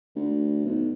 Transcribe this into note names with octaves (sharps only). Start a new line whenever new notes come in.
D2
B1